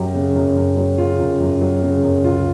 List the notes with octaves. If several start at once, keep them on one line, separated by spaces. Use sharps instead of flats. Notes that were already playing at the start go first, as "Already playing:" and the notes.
Already playing: F#2 F#3 G4
C#3
F#2
F#2
F#3
C#3 F4
F#2
F#2
F#3
C#3
F#2
C#2 F4